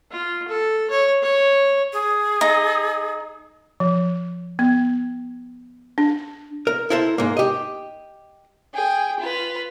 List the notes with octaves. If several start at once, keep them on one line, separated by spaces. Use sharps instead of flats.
F4
A4
C#5
C#5
G#4
D#4
F3
B3
D4
A#4
E4 A4 A#4 C5 E5
G#2 A#3
G4 D#5
G#4 G5
F4 B4